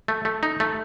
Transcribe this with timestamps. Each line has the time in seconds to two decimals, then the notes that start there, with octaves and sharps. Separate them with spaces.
0.08 A3
0.25 A3
0.43 D#4
0.60 A3